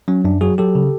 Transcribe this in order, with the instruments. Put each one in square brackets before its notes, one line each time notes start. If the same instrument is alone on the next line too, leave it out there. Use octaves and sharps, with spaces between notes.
[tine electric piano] F#3 C#4
F#2 D4
F#3 F#4 G#4
F#3 G4 A4
C#3